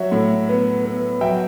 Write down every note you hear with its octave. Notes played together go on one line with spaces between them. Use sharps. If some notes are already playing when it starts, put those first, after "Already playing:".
Already playing: F#3 C#5 E5
A2
B3
B3
F#3 E5 G5